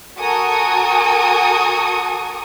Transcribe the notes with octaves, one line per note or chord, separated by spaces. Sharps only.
F#4 A4 A#4 G#5 C#6 D#6